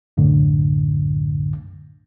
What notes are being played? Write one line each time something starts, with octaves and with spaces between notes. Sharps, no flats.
C2 F#2 A2 D3